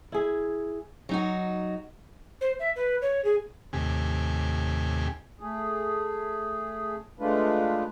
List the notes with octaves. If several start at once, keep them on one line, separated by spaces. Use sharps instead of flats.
E4 G#4
F#3 D#4 F#4
C5
E5
B4
C#5
G#4
D#2 A2 C3 G4 G#5
A3 G#4
G#3 A3 D4 F4 B4